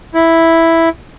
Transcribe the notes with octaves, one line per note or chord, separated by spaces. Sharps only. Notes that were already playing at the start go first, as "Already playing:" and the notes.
E4